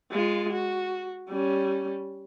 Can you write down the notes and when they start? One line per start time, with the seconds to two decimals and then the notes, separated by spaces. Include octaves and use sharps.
0.11 G#3 F4
0.53 F#4
1.28 G3 C#4